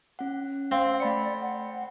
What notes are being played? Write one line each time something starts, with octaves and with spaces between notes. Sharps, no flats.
C#4 F#5
C4 F5
A3 D5 B5 C#7
F#5